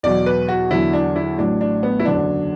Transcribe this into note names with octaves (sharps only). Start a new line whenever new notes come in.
E2 B2 F#3 D5
B4
F#4
E2 D3 F#3 E4
D4
E4
A1 A2 F#3 D4
D4
B3
E4
F#1 E2 D3 F#3 D4